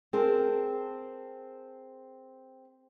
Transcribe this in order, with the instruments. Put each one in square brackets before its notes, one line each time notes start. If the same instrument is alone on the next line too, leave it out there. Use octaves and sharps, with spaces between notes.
[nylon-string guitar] C4 G#4 A#4 A5